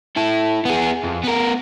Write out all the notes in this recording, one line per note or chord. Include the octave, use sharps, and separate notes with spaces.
E4 A4
B3 G#4
F2
B3 A#4